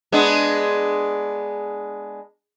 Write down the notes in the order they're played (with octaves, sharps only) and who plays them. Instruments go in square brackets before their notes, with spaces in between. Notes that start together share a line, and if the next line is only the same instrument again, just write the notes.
[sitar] G#3 B3 D4